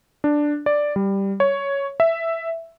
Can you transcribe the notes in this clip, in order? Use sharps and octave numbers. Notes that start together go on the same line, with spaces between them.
D4
D5
G3
C#5
E5